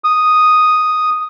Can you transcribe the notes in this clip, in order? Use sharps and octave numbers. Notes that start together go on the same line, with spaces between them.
D#6